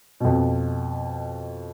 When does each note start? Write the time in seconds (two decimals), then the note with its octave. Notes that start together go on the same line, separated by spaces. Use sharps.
0.20 F2 B2